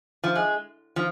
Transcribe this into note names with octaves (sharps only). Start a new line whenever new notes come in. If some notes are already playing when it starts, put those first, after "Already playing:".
F3
G#3
F3